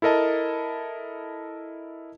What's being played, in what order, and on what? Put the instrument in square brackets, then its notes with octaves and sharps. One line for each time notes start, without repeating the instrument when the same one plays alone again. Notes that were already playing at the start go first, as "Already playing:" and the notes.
[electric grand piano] E4 A4 A#4 D#5 A5